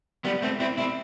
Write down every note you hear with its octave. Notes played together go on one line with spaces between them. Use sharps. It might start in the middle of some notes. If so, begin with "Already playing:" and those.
G3 B3
A3 C4
C4 E4
C4 E4